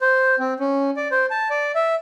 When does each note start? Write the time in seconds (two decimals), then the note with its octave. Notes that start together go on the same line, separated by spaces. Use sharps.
0.01 C5
0.39 C4
0.60 C#4
0.96 D5
1.11 C5
1.31 A5
1.50 D5
1.75 E5